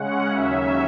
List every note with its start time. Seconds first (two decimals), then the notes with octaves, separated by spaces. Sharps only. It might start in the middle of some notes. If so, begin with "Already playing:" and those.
Already playing: C#3 G#3 C#4 F#5
0.29 D#2 C#3 F#3 C#4 E5